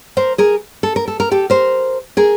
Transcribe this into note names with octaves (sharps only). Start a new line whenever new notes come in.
A#4 C5
G#4 A#4
A4
A#4
A4
A#4
G4 A4
A#4 C5
G#4 A#4